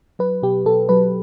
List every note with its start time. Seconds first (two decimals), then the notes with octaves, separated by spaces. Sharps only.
0.19 F#3 B4
0.42 B2 G4
0.66 B2 A4
0.89 F#3 B4